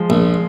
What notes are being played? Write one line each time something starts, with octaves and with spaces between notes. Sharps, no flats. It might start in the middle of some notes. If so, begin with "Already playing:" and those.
Already playing: F3 G#3
A#1